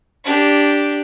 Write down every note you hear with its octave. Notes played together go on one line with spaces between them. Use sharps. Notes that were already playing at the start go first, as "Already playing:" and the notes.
D4 G4